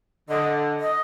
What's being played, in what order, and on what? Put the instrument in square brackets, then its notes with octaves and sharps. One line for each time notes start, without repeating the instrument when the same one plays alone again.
[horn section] D3 [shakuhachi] D#5
[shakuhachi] D#5